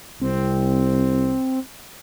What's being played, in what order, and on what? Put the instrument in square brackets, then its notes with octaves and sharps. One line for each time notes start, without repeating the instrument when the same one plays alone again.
[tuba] C2 [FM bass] C4